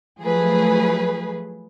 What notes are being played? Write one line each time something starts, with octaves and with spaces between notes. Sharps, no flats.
F3 F#3 A3 G#4 B4